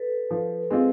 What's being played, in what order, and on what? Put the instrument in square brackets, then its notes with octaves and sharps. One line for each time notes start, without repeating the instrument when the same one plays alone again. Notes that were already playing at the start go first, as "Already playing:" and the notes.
Already playing: [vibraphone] A4 B4
[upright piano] F3
G#3 C4 F4